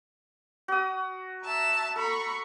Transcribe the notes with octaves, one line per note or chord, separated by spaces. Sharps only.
F#4 D#6
E5 A5 A#5
A4 A#5 B5 C#6